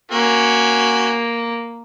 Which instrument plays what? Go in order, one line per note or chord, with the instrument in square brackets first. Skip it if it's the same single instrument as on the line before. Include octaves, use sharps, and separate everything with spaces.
[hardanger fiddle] A#3 [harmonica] C#4 F#4